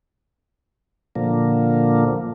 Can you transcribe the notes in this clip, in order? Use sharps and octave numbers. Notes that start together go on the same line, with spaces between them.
A#2 D3 F3 A#3